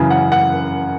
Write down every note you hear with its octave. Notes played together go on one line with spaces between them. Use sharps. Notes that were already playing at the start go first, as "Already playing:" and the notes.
Already playing: F#2 C#3 E3
F#5
F#5